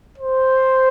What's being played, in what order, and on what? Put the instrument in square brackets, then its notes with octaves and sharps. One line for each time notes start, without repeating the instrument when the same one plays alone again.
[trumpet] C5